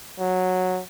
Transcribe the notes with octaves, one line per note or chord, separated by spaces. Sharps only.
F#3